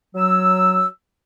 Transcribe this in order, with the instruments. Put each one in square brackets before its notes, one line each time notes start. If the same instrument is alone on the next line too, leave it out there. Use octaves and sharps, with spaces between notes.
[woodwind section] F#3 E6